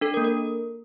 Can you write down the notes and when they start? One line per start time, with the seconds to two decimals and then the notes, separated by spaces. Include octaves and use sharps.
0.01 D4 A4
0.14 A#4
0.17 A#3
0.25 A#4